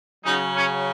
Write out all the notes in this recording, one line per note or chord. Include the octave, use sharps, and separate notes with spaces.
C#3 F#3 D#4
C#4